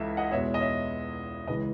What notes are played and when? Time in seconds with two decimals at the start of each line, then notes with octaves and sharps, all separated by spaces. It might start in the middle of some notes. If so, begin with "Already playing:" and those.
Already playing: C#2 C#3 E3 A4 E5
0.17 D#5 F#5
0.31 E2 B2 G#3 C#5 E5
0.54 D#5
0.60 C#5 E5
1.47 C#2 C#3 E3 G#3 B4 D#5